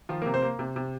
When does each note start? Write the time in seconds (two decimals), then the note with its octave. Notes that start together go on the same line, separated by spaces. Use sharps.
0.09 D#3 F3 F4
0.22 C3 A#3 A#4
0.34 C4 C5
0.42 A#3
0.59 C3
0.76 C3